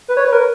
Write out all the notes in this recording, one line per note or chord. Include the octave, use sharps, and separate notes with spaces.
B4
C#5
B4
A#4